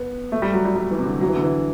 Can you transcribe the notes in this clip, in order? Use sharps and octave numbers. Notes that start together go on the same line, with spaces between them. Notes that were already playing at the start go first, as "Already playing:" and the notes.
Already playing: B3
A3
G3
F#3
G3
G3
E3
C3
D3
F#3
E3
D3
E3